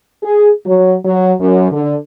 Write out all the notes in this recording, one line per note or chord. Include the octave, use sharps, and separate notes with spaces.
G#4
F#3
F#3
F#2
D3